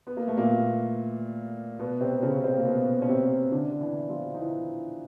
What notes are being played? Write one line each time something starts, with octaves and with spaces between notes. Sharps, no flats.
B3
A#3
A3
A#2 A#3
B2 B3
C3 C4
C#3 C#4
C3 C4
A#3
B2 B3
C#4
C3 C4
D3 D4
E3 E4
F3 F4
D#4
E3 E4